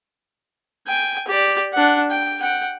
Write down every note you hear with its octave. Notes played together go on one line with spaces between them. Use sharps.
G5 G#5
G4 D5
D4 F#5
G5
F#5 G5